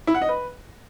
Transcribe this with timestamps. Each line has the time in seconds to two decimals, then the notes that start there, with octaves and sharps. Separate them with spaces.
0.07 E4
0.14 F#5
0.22 D#5
0.29 B4